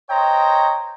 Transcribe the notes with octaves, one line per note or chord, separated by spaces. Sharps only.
C5 C#5 D#5 G5 A#5